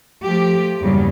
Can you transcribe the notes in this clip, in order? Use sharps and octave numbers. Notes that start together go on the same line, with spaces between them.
F3 A3 G4
E2 G2 C#3 F#3 G3 A#3